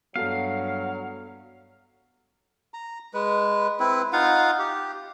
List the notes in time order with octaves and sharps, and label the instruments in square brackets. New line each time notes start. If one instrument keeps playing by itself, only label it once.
[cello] G2 [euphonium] F#3 [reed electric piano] B3 F#4 A4 [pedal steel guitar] F5
[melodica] A#5
G#3 B4
C4 E4 B4
D#4 F4 F5 F#5
G4